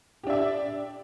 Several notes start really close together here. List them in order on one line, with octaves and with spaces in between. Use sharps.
G4 D4 E5 D5